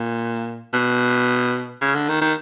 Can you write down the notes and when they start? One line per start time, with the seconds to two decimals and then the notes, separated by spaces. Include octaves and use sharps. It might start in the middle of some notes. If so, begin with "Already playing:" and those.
Already playing: A#2
0.73 B2
1.81 C#3
1.95 D3
2.09 D#3
2.22 D#3